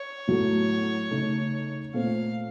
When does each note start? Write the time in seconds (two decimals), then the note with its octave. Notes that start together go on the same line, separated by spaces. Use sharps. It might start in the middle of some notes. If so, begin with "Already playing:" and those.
Already playing: C#5
0.27 A2 F#3 A3
1.11 C#3 A3 D#4
1.94 A#2 A3 C4 F5